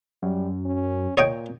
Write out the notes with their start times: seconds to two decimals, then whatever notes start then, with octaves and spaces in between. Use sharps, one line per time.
0.22 F#2 G3
0.65 C#4
1.17 A#2 C#5 D#5 G5